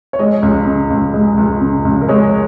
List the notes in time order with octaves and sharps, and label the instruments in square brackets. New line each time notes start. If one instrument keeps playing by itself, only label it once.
[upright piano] C#5
G#3 D#5
C#2
C#3
C#2
G#3
C#2
C#3
C#2
A#4
G#3 C#5